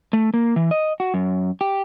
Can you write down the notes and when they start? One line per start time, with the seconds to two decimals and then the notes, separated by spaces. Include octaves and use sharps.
0.13 A3
0.34 A#3
0.56 E3
0.71 D#5
1.00 F#4
1.14 F#2
1.61 G4